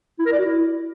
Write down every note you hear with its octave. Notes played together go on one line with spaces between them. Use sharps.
E4
A#4
D5
F#4
E4